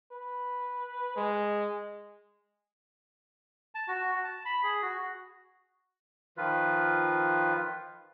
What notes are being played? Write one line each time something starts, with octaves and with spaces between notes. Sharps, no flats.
B4
G#3
A5
F#4
A5
B5
G#4
F#4
D#3 F3 F4 B4